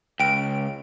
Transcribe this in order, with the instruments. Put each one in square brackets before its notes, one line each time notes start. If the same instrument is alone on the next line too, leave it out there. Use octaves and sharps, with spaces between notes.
[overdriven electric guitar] C#2 [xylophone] G5 D7